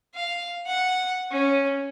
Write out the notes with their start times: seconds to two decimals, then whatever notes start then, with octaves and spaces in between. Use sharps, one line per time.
0.15 F5
0.66 F#5
1.31 C#4